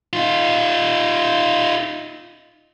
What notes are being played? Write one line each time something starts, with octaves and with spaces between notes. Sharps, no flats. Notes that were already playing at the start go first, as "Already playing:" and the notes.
D#4 F4